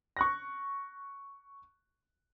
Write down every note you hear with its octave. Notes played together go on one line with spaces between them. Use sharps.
C#6 F#6 A#6